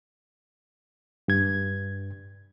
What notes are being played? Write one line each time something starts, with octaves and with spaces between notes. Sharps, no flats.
G2 G#6